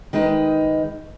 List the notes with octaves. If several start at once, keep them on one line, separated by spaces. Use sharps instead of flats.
D#3 G#3 D#4 B4